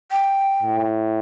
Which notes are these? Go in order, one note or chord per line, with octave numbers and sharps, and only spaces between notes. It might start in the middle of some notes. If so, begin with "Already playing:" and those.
G5
A2